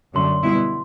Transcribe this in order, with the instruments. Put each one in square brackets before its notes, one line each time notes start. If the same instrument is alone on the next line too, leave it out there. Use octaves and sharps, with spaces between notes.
[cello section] F#2 D3 F#3 A3 [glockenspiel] C6
[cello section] B2 G3 B3 E4